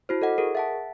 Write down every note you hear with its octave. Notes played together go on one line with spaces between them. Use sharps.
E4 F#4 C5
A4 D#5 F#5
G#4 A#4
E5 F#5 A5